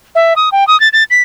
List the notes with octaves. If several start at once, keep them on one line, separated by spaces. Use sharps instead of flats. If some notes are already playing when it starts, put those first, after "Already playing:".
E5
D#6
G5
D#6
A6
A6
B6